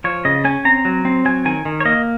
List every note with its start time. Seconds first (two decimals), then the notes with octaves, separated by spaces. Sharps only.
0.04 F3 C#5
0.25 C#3 D#5
0.45 C#4 G#5
0.65 C4 A#5
0.85 F#3
1.05 C4
1.25 F#3 G#5
1.45 D#3 G#5
1.65 D#3
1.80 C#5
1.85 A#3 D#5